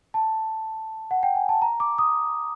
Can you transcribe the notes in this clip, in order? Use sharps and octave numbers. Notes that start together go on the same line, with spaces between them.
A5
F#5
G5
G#5
A5
A#5
D6
D#6